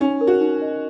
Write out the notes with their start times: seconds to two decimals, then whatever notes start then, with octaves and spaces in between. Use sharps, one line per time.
0.01 C#4 D#4
0.21 A#4
0.27 F#4
0.41 D#4
0.62 D#5